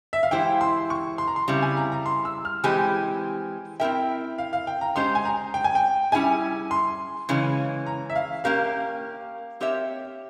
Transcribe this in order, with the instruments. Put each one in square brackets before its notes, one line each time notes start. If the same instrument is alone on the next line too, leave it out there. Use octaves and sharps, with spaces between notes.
[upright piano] E5
F5
[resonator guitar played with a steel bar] E3 G#3 E4 G4 C5 [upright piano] G5
[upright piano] C6
C#6
C6
A#5
C6
[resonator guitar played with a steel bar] C#3 G3 C4 E4
[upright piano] G#5
A#5
A#5
C6
E6
F6
[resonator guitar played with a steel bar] E3 G#3 C4 G4 [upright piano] G#5
[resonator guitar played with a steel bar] C4 E4 A#4 E5 [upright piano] G5
[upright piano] F5
F5
G5
A#5
[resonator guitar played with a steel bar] G#3 C#4 G4 C5 [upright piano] C6
[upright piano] G#5
A#5
G5
G#5
G5
[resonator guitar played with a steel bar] G3 C#4 E4 G#4 E5 [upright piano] G#5
[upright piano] C6
[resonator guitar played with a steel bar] C#3 E3 G#3 C#4
[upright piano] A#5
E5
F5
[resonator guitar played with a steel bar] A#3 C#4 G4 A#4 [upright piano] F5
[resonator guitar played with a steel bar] C4 G4 A#4 C#5 E5